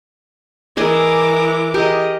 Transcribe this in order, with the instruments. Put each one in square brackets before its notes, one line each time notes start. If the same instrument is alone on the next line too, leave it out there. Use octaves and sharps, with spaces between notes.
[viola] E3 D6 [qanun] G#4 D#5 G#5 [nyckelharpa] A#4
[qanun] G4 A#4 [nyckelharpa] G#4 D#5